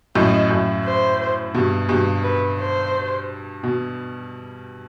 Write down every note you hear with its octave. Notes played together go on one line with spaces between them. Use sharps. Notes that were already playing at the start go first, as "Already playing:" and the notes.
F#2 A2 D#5
F#2 A2
C5
G2 B2
G2 B2
B4
C5
B2